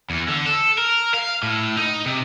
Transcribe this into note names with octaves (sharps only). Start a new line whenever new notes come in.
E2
D3
A4
A#4
F5
A2
D#4
C3